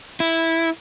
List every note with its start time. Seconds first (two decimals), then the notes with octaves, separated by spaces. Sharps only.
0.20 E4